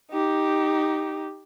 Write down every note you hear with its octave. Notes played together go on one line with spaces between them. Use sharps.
D#4 G4